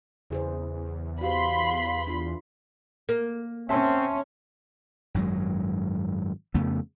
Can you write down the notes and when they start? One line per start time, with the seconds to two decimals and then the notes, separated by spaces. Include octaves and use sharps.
0.30 E2 C#3 G#4 C5
1.21 F#4 G4 C5 F5 B5 C6
2.07 D4 F4
3.09 A#3
3.69 C4 C#4 E5 A5 C6
5.14 G#1 F#2 F#3 G#3
6.54 F2 C#3 A3 B3